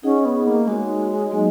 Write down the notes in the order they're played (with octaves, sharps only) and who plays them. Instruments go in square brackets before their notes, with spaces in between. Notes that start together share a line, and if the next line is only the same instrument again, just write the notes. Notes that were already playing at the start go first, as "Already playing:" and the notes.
[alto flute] C#4 [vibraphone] D#4 G#4 D#5 F#5
[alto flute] B3
A#3
[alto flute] G#3 [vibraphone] D#4 F#4 C#5
[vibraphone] F#3 A#3 D#4 G#4 D#5